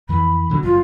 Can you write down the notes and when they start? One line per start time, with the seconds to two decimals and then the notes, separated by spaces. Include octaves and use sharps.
0.09 F2 E3 B5
0.50 B2 D3 F#3
0.63 F#1 F#2 F4